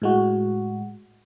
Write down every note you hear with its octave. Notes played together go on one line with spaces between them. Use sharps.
A2 G#3 F#4